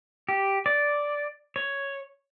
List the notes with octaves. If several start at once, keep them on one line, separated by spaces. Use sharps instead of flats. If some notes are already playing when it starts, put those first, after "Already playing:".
G4
D5
C#5